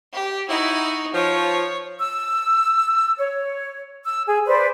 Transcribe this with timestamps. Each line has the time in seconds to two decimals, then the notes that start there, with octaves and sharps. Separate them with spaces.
0.13 G4
0.48 D#4 E4 F#4
1.13 F3 C#5
1.99 E6
3.18 C#5
4.04 E6
4.26 G#4
4.46 B4 C5 D5